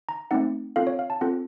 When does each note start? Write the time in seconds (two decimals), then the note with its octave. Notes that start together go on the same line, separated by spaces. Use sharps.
0.09 A#5
0.31 A3 C4 D#4 F#5
0.76 C4 F4 A4 F5
0.87 C#5
0.99 F5
1.10 A5
1.21 C4 F4 A4 F#5